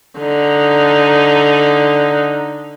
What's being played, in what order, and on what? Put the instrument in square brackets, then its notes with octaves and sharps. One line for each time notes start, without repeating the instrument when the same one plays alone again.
[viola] D3 D#4